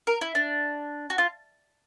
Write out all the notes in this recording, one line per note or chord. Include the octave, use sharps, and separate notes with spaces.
A#4
E4
D4
F#4
F4